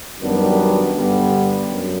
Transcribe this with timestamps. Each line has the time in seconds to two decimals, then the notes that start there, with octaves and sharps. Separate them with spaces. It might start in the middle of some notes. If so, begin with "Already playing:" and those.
0.20 F#2 D#3 G3 B3 D4
0.94 G2 D3 G3 B3
1.70 F#2